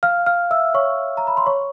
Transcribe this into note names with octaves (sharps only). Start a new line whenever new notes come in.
F5 F6
F5 F6
E5 E6
C#5 C#6
A#5
B5
C6
C#5 C#6